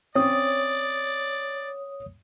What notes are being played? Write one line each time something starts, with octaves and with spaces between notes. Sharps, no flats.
C4 C#4 C#5 D5 D#6